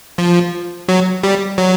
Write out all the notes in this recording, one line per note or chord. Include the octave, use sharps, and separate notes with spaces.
F3
F#3
G3
F#3